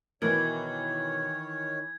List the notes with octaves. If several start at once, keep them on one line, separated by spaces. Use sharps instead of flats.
B2 D#3 E3 A#4 C#5 G#6